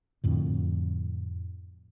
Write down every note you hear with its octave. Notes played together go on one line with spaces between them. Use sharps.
F2 A2 D3